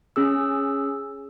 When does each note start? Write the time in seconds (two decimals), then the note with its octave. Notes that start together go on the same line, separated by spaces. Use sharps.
0.16 C#4 G#4 E6